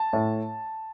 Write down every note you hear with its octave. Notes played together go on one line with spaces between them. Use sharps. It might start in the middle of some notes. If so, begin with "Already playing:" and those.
Already playing: A5
A2